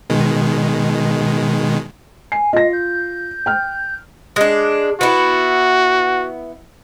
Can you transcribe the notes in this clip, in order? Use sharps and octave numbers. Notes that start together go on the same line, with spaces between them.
B2 D#3 G#3
G#5 C7
F4 D#5 A#6
G6
G5 F6
G#3 D4
B3 E4 F#4